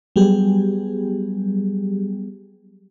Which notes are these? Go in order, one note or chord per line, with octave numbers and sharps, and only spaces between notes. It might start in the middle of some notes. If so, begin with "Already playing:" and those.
F#3 G3 B3 G4 G#4